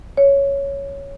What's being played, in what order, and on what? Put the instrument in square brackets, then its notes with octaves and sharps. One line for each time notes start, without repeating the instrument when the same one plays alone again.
[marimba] C#5